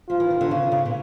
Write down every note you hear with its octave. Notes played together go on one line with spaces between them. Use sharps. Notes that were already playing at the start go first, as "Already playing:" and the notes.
F3 F4
E3
D#3
D3
C#3
C#3
A#2